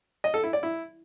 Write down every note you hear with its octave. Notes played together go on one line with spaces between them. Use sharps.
D#5
A4
E4
D5
E4